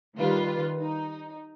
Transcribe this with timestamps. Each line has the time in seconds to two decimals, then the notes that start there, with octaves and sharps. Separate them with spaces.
0.17 D#3 G3 F4 B4
0.79 D#4